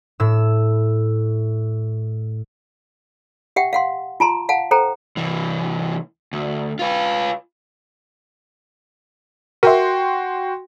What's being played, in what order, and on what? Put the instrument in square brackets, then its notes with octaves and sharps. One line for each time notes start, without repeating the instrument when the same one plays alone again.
[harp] A2 E6
[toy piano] G4 E5 F#5 G5
F5 F#5 C6
F4 A5 A#5 C6
F5 F#5 A5
A4 C5 G5 A#5
[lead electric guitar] C2 E3
D2
F4 B4
[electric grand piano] F#4 G5 C6 [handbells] A#4 E5